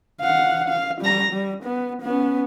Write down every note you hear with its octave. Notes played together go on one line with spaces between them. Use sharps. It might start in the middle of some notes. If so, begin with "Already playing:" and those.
F5 F#5
F5
G3 A#5
G3
B3
B3 C#4